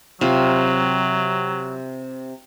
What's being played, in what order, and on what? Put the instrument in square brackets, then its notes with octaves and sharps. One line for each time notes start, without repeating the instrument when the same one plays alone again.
[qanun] C3 F4 [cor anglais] F#3